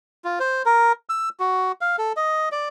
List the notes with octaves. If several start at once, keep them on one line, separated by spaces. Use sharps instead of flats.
F4
C5
A#4
E6
F#4
F5
A4
D#5
D5